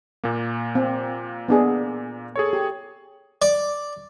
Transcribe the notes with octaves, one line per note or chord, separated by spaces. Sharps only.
A#2 A#3
C4
B3 D4 G#4
G#4 A4 C#5
G4
D5